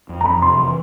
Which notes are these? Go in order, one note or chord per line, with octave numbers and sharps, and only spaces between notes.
F2
A#5
F2 B5
C3 C6
E3